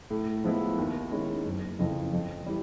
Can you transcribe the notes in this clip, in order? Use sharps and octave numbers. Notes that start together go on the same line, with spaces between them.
A2
F3 G#3 B3 E4
D#2
D#3 G#3 C#4 E4
F#1
F2 C#3 E3
F2
E3 G3